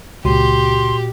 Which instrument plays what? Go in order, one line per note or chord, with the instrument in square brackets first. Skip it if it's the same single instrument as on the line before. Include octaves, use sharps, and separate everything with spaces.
[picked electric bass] C#2 [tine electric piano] A#2 F#4 [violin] G4 [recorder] C6